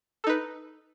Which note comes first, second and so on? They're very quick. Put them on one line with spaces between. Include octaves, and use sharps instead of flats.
A4 D#4 B4